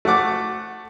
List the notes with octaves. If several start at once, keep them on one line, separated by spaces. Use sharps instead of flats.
A3 F#4 F#5 D6